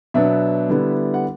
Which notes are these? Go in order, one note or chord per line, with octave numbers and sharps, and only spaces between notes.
B2 F#3 B3 D4 E5
D3 G3 B3 E4
F#5